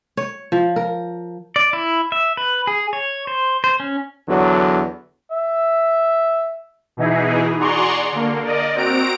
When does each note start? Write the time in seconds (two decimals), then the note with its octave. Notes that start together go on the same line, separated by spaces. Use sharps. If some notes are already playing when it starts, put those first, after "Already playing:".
0.17 C#5
0.52 F3
0.76 A#4
1.56 D5
1.73 E4
2.12 E5
2.37 B4
2.67 G#4
2.93 C#5
3.27 C5
3.64 C5
3.80 C#4
4.29 E2 D3 F#3
5.32 E5
6.97 B2 E3 D#4 E4 G#4
7.60 F#4 G#4 D5 A#5 C6 C#6
8.12 D3 A#3
8.44 A#4 D5 D#5
8.75 C4 F#4 A#5 D7